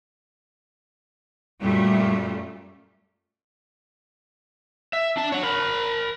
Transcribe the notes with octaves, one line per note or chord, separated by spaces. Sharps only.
F#2 A#2 G3 A3
E5
D4 A5
C#5 F#5
A#4 B5